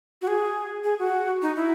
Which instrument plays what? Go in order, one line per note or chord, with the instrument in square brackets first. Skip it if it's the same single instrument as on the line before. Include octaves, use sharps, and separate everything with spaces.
[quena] F#4
G#4
G#4
F#4
D#4
E4